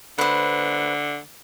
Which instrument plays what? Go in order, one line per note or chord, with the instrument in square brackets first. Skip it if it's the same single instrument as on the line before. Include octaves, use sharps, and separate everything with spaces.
[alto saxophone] D3 [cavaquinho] B4 C5